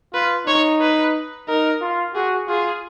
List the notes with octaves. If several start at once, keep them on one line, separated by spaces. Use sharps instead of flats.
F4 B4
D#4 C#5
B4
D#4 A#4
F4
F#4 G#4
F4 G#4